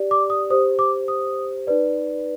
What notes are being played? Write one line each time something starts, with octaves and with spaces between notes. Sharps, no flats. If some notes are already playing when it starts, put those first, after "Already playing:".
Already playing: G4 D5
D6
D#6
G4 C5 D#6
D6
D#6
D#4 B4 D5